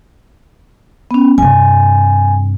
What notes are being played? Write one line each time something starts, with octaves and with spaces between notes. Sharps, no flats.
B3 C#4
G2 C3 G#5